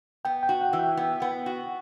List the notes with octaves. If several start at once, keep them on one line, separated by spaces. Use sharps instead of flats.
B3 G5
G5
F#4
F#5
E3
G5
B3
B3
F#4